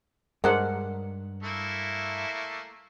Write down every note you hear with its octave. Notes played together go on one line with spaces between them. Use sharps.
G2 G#3 D4 A#4 C5 F#5
A3 A#3 E4